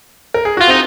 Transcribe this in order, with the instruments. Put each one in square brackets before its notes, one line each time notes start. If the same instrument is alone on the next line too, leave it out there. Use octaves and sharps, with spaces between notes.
[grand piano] A#4
G#4
F#4
[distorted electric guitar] F4
[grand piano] C4 [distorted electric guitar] D#4